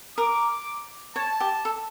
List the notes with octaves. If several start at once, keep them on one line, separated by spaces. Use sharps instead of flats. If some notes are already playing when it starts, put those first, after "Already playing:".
A#4 D6
C#5 A5
G4
A4